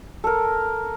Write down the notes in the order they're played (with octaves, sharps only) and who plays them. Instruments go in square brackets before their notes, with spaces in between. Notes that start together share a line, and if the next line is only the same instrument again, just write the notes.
[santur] A4 A#4